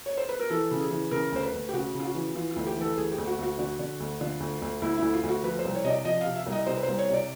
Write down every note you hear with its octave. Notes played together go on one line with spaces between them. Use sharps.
C#5
C5
B4
A#4
E3 A4
C#3
G#4
E3
C#3 A#4
D2 C5
B4
D2
G4
C#3 F#4
C#3
F4
F#4
E3
E3 F4
F4
D2
G4
E3 A4
D2 G#4
G4
D2
F#4
D2 F#4
D3 F#4
D3
D2
D3 F4
D2
D2
D2 E4
D2 E4
F4
D2
F#4
F3 B4
C5
C2
C#5
C3 D#5
D5
F3 D#5
C3 F5
E5
C2
D#5
C3 C5
B4
C2 C5
C#5
C3 D5